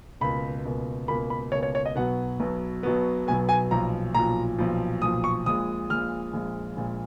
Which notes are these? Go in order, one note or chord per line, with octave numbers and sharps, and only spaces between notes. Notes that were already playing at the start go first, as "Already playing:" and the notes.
C#2 B2 A#3 B5
C#2 B2 A#3
C#2 B2 A#3 B5
B5
C#2 B2 A#3 C#5
C#5
C#5
D#5
B1 B2 F#3 B3 F#5
B1 B2 F#3 B3
B1 B2 F#3 B3
B1 B2 F#3 B3 G#5
G#5
B1 A#2 F3 A#5
B1 A#2 F3 A#5
B1 A#2 F3
B1 A#2 F3 D#6
C#6
A#1 A#2 G#3 D#6
A#1 A#2 G#3 F6
A#1 A#2 G#3
A#1 A#2 G#3